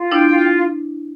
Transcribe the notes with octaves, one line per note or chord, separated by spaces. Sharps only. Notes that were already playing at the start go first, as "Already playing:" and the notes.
Already playing: F4
D4 E4 G5
F4